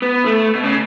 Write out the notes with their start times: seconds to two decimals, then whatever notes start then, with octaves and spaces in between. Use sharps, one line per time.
0.02 B3
0.26 A3
0.55 B2
0.64 C#3